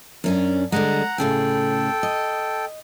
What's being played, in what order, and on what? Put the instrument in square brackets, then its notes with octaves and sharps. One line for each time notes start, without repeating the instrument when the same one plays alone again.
[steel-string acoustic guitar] F#2 C#4 D4
[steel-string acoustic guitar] D3 G3 G#3 [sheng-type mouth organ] F#5 A#5
[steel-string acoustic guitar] A2 C#3 G#4 [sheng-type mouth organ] A4 G5
[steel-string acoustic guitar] D#5